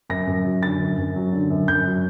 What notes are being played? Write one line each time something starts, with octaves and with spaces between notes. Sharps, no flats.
F#2 A#6
F#2
F#3
D3 A6
F#2
F#2
F#3
D3
F#2
F#2 G6
F#3